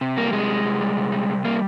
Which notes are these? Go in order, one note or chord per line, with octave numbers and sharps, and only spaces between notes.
C3
G3 A#3
C3 G#3
G3
C3
G3
C3
G3
C3
G3 A#3